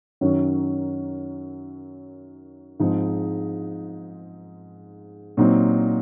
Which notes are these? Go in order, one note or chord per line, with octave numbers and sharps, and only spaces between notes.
F#2 D#3 F#3 C#4
G#2 F3 C4 D#4
A#2 F#3 C4 D#4